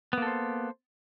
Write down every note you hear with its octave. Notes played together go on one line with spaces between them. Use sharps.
A#3 B3 A4 C5